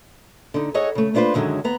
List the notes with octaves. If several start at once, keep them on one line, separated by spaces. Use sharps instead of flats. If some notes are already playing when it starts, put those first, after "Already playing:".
D3 D#4
G#4 A4 C#5 D#5 F#5
C#3 A3
A#3 B3 D4 F4 B4 C5
F#2 D3 D#3 F3 F#3 G#3
D#2 B3 A#5